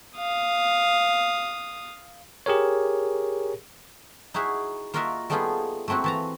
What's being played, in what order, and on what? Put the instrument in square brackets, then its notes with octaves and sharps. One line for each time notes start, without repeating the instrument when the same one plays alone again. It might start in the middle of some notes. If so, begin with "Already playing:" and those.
[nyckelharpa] F5 D#6
[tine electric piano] G4 G#4 A#4 C#5
[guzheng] D#4 E4 F#4 G#4 E5
A#3 F4 F#4 A#4 D#5 E5
G3 A3 B3 D#4 F4 G#4
A3 A#3 C4 E4 F#4
E3 A5 A#5